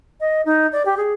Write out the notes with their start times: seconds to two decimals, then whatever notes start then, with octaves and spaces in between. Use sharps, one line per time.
0.20 D#5
0.46 D#4
0.72 D5
0.85 G4
0.97 G#4